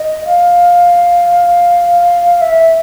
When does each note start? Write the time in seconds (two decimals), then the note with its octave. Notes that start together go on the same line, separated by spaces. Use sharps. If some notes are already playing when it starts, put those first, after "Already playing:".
Already playing: D#5
0.25 F5
2.41 E5